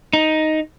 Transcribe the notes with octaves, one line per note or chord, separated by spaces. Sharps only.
D#4